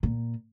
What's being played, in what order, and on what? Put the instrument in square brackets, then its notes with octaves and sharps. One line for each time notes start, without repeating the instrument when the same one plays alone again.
[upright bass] A#2